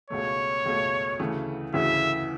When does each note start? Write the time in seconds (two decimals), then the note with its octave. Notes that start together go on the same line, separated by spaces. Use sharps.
0.10 C#2 B2 A3 C#5
0.65 C#2 B2 A3
1.19 D2 C#3 E3 A3
1.74 D2 C#3 E3 A3 E5